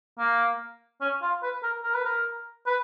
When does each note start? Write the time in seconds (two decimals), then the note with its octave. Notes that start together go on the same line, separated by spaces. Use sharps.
0.19 A#3
1.01 C#4
1.22 F4
1.43 B4
1.63 A#4
1.83 A#4
1.94 B4
2.05 A#4
2.67 B4